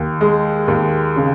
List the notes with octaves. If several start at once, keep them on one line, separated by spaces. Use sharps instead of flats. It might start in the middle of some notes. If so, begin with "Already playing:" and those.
Already playing: D#2
G#3
D#2
C#3